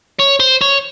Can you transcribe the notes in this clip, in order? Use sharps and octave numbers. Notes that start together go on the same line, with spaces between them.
C#5
C5
C#5